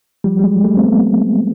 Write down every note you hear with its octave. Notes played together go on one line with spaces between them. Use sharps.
F3 G3
G3
F#3 G#3
G3 A3
C4
A3 B3